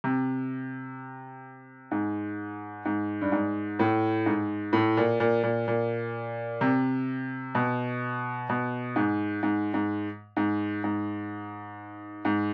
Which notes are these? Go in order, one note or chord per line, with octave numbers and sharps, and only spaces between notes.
C3
G#2
G#2
G2
G#2
A2
G#2
A2
A#2
A#2
A#2
A#2
C3
B2
B2
G#2
G#2
G#2
G#2
G#2
G#2